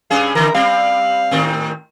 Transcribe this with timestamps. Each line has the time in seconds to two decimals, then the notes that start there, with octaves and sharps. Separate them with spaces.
0.10 G2 C#4 G#4 F5
0.35 D3 E3 A#4
0.54 G3 C4 F5
1.31 A2 D#3 C4